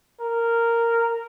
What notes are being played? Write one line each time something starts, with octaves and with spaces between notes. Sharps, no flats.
A#4